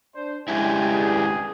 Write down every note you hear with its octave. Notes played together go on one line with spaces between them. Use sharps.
D4 C5
G2 G#3 C#4 E4 G4 G#5
G#4